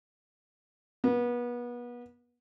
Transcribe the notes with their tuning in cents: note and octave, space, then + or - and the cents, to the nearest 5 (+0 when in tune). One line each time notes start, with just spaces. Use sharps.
B3 -30